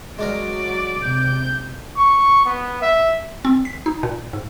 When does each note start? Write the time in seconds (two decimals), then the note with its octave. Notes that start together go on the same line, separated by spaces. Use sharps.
0.19 F#3 G#3 D4 A#4 D5
1.02 C3 G6
1.97 C#6
2.45 B3
2.82 E5
3.45 C4
3.65 B6
3.86 D#4
4.03 A#2
4.33 G#2